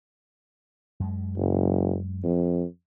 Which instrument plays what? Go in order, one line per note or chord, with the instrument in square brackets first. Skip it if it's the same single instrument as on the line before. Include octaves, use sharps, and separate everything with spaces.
[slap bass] F#2 G#3
[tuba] F#1
F2